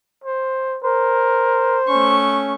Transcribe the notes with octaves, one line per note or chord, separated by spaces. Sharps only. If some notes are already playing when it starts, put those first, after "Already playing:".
C5
A#4 C5
A3 C#4 C#6